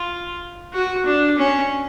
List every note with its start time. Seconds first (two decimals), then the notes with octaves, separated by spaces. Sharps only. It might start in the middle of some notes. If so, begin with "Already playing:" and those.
Already playing: F4
0.74 F#4
1.06 D4
1.38 C#4